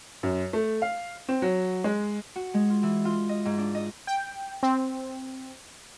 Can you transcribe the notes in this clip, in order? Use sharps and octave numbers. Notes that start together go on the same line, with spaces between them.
F#2
A3
F5
C4
F#3
G#3
F#4
G#3
F4
E3
F4
D#5
G#2
D4
D#5
G5
C4